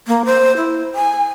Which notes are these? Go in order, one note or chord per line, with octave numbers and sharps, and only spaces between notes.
A#3
C5
E4
G#5